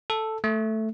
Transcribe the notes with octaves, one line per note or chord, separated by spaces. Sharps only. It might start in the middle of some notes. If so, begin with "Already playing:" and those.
A4
A3